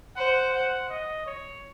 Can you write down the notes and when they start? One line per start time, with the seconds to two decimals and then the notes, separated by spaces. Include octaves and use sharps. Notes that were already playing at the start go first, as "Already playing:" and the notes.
0.16 C5 F#5
0.53 F#5
0.90 D#5
1.26 C#5